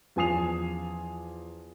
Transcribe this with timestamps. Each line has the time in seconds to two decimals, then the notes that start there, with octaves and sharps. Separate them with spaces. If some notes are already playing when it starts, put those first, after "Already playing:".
0.16 E2 F3 G#5 D#6 C7 F7